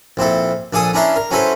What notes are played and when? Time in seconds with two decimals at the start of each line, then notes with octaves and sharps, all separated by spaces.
0.17 A#1 C4 E4 A4
0.73 A#1 D4 A4 G#5 D#6
0.93 C#4 D4 E4 A#4 E5 C6
1.16 A#4
1.31 F#3 C#4 E4 A4 B4 C5